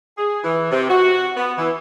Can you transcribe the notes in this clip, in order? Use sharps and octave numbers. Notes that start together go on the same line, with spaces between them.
G#4
E3
C3
F#4
B3
E3